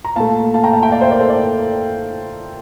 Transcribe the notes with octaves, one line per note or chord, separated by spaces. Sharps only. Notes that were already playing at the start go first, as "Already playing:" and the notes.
A#5
A#2 A3 F5 A5
F5 A5
G5 A#5
F5 A5
E5 G5
D5 F5
C5 E5
A#4 D5
A4 C5
D5